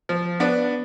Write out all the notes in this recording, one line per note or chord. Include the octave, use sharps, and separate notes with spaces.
F3
B3 D4